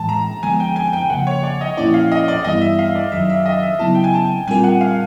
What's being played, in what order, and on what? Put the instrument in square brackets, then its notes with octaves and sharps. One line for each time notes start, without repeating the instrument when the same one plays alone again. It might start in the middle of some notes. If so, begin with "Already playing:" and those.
Already playing: [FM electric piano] A2 E3 G#3 [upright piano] A5
[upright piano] A#5
[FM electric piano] D3 F3 G#3 B3 [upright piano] G#5
[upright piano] G5
G#5
G5
[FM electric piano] C#3 F3 A#3 [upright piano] F#5
[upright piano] C#5
D5
D#5
[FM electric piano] A#2 F3 A#3 C#4 E4 [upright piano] D5
[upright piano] F5
D#5
D5
[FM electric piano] G2 E3 G3 B3 E4 [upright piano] D#5
[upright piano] E5
F5
D5
[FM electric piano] F#2 D#3 F#3 [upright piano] E5
[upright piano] E5
D#5
E5
[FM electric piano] C#3 F#3 B3 E4 [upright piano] A5
[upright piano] G5
G#5
A5
[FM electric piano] A#2 G3 C4 F4 A#4 [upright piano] G#5
[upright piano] F#5
F5